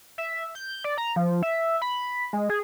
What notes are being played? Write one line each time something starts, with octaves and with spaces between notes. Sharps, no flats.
E5
G6
D5
A#5
F3
E5
B5
G#3
G#4